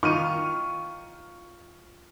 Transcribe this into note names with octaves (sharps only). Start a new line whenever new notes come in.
D#3 F4 C#6 F6 D#7